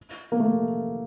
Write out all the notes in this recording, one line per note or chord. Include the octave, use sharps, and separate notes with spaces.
A#3
A3